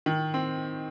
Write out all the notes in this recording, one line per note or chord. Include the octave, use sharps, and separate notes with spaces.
D#3
C4